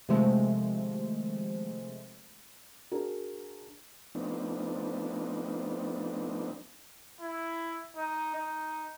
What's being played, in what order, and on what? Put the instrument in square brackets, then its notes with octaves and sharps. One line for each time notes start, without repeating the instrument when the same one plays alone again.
[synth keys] C3 D#3 F3 G#3 A3 C4
[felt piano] D4 F#4 G#4 A#4
[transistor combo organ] F3 A3 B3 C4 D4 D#4
[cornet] E4
D#4
D#4